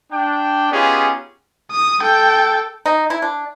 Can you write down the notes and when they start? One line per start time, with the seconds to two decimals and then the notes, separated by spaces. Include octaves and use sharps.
0.12 D4 G5
0.72 B3 C#4 D#4 F4 G4 G#4
1.72 D#6
2.02 A4 G5
2.86 D#4
3.10 E4
3.22 D4